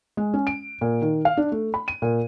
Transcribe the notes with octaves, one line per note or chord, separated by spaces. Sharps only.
G#3
C#4
D7
A#2
D#3
F5
D4
A3
B5
D#7
A#2